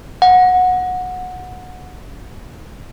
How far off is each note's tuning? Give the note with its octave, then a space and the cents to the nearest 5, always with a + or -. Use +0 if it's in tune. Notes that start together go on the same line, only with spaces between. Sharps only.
F#5 -15